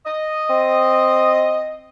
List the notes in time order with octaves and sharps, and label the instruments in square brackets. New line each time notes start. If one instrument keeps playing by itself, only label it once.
[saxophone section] D#5
[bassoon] C4